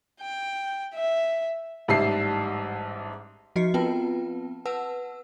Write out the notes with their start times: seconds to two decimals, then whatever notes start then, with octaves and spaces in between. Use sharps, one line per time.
0.21 G5
0.95 E5
1.88 A1 G#2 G3 E5 A5 C7
3.56 F3 F#4 D#5 C7 C#7
3.74 B3 C4 F4 B4 G5 A5
4.65 B4 F#5 A5 E6